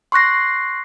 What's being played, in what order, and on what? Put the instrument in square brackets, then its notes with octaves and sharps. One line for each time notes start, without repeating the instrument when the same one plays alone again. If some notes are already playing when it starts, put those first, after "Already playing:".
[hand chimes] C6 C#6 F#6 A#6 C7